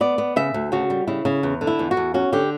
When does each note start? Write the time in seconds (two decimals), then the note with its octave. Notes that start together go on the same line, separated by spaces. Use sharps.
0.01 B3 D5
0.18 B3
0.36 C#3 E5
0.54 D2
0.72 C#3 F#4
0.90 G3
1.07 C#3 E4
1.25 C#3
1.43 E2
1.61 D3
1.67 E4
1.79 E2
1.91 F#4
1.97 E2
2.14 C#4 F#4
2.33 D3 G4